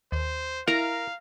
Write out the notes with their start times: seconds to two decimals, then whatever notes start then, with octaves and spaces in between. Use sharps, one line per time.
0.12 D#2 C5
0.68 E4 A#4 F5 A#5